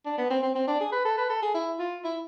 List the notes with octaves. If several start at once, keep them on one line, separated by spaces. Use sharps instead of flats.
D4
B3
C4
C4
C4
D4
G#4
B4
A4
B4
A4
G#4
E4
F4
E4